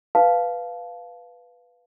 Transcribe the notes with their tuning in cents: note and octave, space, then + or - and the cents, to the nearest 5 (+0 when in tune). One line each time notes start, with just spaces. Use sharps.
B4 +0 F5 +0 A5 -15